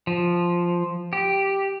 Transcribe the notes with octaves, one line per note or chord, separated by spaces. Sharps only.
F3
G4